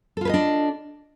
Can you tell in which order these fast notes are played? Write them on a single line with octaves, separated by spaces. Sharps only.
A4 F4 B4 D#5 D4